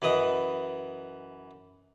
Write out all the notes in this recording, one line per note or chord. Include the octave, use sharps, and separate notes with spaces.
F#2 E3 B4 D#5 D#6